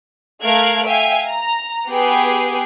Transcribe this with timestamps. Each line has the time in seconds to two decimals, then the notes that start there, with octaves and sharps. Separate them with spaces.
0.42 A3 A#4 F5 F#6 G#6 D7
0.86 E5 F5 G5 G#5
1.27 A#5
1.89 B3 G4 G#4 B4 G5 C7